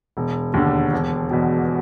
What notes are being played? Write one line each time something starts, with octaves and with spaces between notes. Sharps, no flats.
E1
D#2 D3
E1
E2 B2